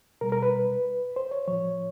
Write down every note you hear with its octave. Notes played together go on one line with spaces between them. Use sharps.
B2 G3 A#4
A#4
B4
C5
C#5
A2 F3 C#5